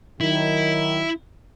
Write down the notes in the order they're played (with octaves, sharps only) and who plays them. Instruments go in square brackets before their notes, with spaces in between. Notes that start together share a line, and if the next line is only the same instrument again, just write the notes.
[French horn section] D#3 F#3 [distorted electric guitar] E4